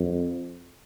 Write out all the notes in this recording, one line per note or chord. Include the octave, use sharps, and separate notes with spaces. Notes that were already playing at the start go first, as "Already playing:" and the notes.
Already playing: F2